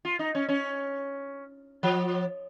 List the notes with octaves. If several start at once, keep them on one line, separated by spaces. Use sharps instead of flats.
F4
D#4
C#4
C#4
F3